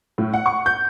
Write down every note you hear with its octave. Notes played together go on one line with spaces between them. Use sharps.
A2
F#5
C#6
G6